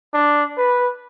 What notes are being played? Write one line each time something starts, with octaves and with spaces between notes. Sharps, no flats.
D4
B4